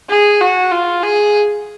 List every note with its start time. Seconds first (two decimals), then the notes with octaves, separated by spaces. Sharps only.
0.09 G#4
0.41 F#4
0.72 F4
1.03 G#4